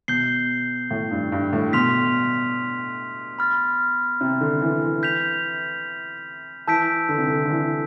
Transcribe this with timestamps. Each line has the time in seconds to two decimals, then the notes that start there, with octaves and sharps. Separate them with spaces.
0.08 B2 G6 C7 G7
0.91 A2
1.11 G2
1.32 G2
1.53 A2
1.73 B2 C6 F6 B6 F7
3.39 B5 F6 A6
4.21 C3
4.41 D3
4.62 E3
4.82 E3
5.03 G6 B6 F7
6.67 E3 A5 E6 G6 B6 D7
7.09 D3
7.18 C3
7.28 D3
7.45 D3
7.50 E3